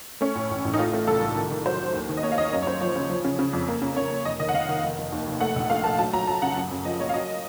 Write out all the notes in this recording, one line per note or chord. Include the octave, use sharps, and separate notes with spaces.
A3 C#4
A2
A1
A1
D#4
A3 F4
A3
C2 A4
C2
D#3
D#3
F#3 C5
F#3
D#2
D#3
D#5
A#3 C#5
F5
D#2 D#5
F#2 C#5
C#5
F#2 C5
F3 C#5
C#3
F3
C#3
C#3
F2
A#3
C#3
C#3 C#5
A#3
F1 D#5
D#3 D#5
F#5
D#3 F5
D#3
F1
F1
D#2
F1
A3 F#5
A#1
A3 F5
A3 A5
F#3 A5
F#3 A#5
F#3 A5
C#3 F#5
F#2
F#2
F3 D#5
A#3 C#5
F5
F#3 D#5